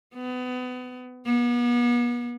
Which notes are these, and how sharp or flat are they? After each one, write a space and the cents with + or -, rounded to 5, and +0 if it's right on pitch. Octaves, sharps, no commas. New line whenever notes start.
B3 +30
B3 -40